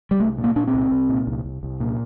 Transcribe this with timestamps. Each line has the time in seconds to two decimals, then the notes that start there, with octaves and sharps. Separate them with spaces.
0.11 G3
0.20 C2 A3
0.38 A#2
0.44 A#3
0.56 A#2 D4
0.68 C4
0.74 C2
0.91 C2
1.09 A#2
1.27 C2
1.44 C2
1.63 C2
1.80 A#2